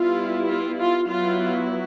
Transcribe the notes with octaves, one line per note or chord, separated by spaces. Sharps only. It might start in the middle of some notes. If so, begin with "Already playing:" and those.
Already playing: G3 B3 E4 F4
F4
F4
F#3 B3 E4 F4